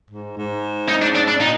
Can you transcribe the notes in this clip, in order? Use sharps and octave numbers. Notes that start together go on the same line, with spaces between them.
G#2
G#2
D#4
D4
D4
D4
A#2 D#4